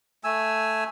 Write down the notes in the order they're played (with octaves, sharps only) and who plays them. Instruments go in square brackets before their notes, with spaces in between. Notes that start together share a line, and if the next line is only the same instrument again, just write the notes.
[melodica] A3 G#5 E6